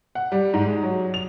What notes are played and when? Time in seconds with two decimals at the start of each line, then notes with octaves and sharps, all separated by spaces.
0.15 F#5
0.32 G3
0.54 G#2
0.66 G#3
0.83 F#3
1.14 F7